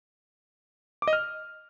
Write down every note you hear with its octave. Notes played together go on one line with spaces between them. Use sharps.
D6
D#5
F6